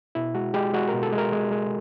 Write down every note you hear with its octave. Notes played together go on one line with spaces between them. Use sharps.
B2 E4
G#3 F#4
G#3 G4
G#3 F#4
A#4
B2
A4
G#3
A#4
G#3
G#3